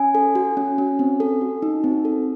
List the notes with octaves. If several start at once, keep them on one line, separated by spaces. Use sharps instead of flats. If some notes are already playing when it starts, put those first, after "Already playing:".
Already playing: C#4 G#5
A4
F#4
C#4
C#4
C4
A4
F#4
D#4
C4
A4